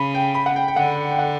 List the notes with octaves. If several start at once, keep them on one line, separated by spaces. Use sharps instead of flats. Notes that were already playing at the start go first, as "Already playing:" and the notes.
Already playing: C#3 B5
G5
B5
F#5
G5
G5
D3 F#5
G5
F#5